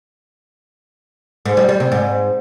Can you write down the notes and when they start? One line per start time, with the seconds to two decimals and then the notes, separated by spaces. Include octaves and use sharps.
1.45 G#2
1.57 G3
1.69 G3
1.80 C3
1.92 G#2